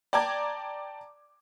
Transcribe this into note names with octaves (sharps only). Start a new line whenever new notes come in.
D5 G5 A5 A#5 D6 G#6